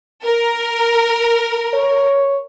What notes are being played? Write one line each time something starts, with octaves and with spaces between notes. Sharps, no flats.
A#4
C#5